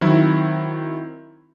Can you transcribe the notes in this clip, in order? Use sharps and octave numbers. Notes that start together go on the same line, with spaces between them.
D#3 F#3 C4 E4